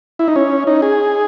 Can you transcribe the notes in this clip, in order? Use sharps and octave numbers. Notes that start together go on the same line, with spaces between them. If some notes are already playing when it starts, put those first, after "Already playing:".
E4
D#4
C#4
D#4
G#4